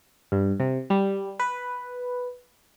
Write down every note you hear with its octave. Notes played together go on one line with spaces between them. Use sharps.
G2
C3
G3
B4